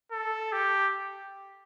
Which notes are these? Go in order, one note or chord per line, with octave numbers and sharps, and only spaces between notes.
A4
G4